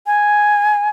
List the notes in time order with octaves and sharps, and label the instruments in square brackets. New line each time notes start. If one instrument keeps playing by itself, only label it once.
[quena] G#5